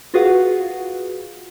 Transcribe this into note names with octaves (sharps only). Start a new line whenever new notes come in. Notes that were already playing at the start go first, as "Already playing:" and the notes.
F4 F#4 G#4 B4 F5 F#5